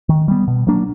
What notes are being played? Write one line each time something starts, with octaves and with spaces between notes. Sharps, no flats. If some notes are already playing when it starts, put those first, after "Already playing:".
D#3
G3 B3
B2
F#3 A#3 D4